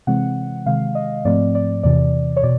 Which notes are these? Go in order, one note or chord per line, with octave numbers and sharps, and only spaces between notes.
C3 E3 G#3 C4 F#5
C3 D#3 G#3 F5
D#5
G#2 F3 A3 C4 D5
D5
E2 C3 E3 D5
C#5
B2 D5